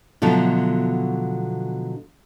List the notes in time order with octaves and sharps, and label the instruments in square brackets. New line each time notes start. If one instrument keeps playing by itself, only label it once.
[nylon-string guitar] B2 D3 F3 F#3 A3